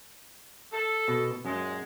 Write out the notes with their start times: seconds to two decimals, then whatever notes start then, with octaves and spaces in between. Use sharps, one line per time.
0.72 A4
1.08 B2
1.45 F#2 A#2 F#3 G#3